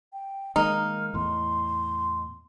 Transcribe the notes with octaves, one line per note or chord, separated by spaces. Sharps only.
G5
D#3 G#3 A#3 D#4 F6
E2 A2 C6